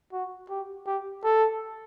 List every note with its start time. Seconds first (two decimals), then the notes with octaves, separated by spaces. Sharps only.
0.13 F#4
0.49 G4
0.86 G4
1.23 A4